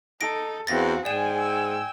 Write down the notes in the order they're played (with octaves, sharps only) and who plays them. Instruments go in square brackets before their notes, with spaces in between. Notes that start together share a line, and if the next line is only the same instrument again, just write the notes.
[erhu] D#4 [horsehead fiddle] A4 [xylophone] A#6 D7
[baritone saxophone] E2 [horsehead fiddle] C4 F5 [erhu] F#4 [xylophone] A6 A#6
[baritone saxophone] G#2 [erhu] G#4 [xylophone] D5 E7 [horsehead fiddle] G5 G#5
[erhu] E6